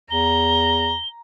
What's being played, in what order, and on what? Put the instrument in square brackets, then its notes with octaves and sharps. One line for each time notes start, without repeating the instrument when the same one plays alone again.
[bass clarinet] E2 [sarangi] A#5 [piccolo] G7